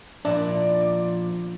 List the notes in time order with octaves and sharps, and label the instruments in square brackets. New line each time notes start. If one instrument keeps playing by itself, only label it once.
[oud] A#2 B3 E4 [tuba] F3 [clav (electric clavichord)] D4 [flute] D5